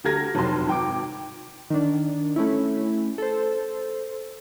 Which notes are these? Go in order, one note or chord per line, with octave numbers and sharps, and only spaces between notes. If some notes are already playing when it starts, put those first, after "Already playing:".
D2 G4 A4 F6 G#6 A#6
F1 B1 E2 F#3 A5 C6
G#1 G5 D6
D#3 D4
A3 C#4 E4
A4 C5